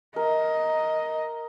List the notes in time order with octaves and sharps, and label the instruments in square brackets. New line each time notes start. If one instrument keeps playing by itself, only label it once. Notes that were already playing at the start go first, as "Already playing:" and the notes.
[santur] A#4 E5 [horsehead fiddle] D#5